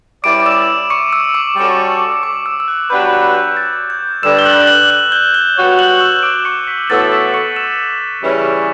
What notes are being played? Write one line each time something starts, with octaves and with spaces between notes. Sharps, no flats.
G3 C#4 E4 B4 D5 D6 D7
E6 E7
C#6 C#7
E6
D6
G3 C#4 F#4 A4 D5
C#6
D6
E6
E6
F#6
F#3 B3 D4 G4 B4 G6
F#6
G6
A6
G6
G2 D3 G3 E6 E7
G7
F#6 F#7
F#6 F#7
F#6 F#7
G6 G7
G6 G7
G3 B3 F#4 C#5
F#6 F#7
E6 E7
D6 D7
C#6 C#7
B6
A2 E3 B3 F#4 A4 A6
B6
C#6 C#7
E6 E7
C#3 E3 G3 C#4